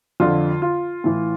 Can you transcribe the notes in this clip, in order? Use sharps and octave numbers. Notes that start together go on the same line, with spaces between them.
F2 D3 F4
F4
A2 E3